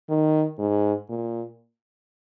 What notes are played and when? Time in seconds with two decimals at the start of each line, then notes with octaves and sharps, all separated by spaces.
0.09 D#3
0.58 G#2
1.09 A#2